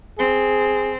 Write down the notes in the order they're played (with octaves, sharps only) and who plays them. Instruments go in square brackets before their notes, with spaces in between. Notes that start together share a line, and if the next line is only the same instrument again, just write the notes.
[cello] C4 [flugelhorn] G#4